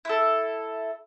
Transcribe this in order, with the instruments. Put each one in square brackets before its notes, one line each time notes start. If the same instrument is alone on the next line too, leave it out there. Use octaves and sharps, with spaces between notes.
[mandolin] E4 A4